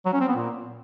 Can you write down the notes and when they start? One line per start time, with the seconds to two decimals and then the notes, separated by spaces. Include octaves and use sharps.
0.05 F#3
0.13 C#4
0.20 C4
0.28 B3
0.35 A#2